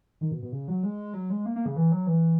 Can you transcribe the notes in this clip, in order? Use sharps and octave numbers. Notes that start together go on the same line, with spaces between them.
D#3
B2
B2
C#3
F#3
G#3
F#3
G#3
A#3
A#3
C#3
E3
F#3
E3